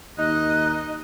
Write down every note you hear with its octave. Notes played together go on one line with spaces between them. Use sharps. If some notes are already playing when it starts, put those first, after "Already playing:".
D#2 D#4 D#5 F#6